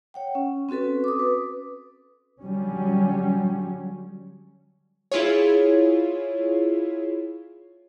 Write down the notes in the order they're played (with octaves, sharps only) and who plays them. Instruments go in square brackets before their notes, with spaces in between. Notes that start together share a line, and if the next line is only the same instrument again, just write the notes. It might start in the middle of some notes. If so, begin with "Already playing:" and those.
[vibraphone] C#5 F#5 G5
C#4
C4 C#4 F#4 A4 B4
D6 D#6
B4
[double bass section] D3 F#3 G3 C#4
[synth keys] E4 F4 G#4 C#5